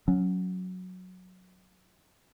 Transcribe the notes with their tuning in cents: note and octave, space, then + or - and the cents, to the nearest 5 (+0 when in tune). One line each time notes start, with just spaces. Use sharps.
F#3 -10 C#4 +0